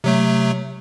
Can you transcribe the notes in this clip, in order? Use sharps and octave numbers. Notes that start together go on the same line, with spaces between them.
C3 F#3 A3